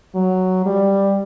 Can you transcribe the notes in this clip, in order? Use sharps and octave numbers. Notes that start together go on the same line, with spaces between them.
F#3
G3